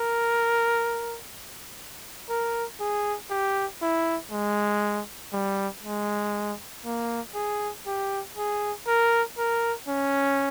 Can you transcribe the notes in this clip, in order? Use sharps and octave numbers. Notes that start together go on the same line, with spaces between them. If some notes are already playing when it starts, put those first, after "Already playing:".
Already playing: A#4
A#4
G#4
G4
E4
G#3
G3
G#3
A#3
G#4
G4
G#4
A#4
A#4
C#4